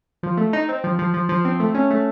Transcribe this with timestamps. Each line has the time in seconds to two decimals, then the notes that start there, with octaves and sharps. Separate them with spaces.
0.23 F3
0.37 A3
0.53 D#4
0.69 C4
0.84 F3
0.99 F3
1.14 F3
1.29 F3
1.45 C4
1.60 A3
1.75 C#4
1.90 A3